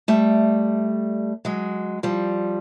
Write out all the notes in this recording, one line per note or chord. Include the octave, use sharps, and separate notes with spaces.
G3 A3
F#3 G#3
F3 G3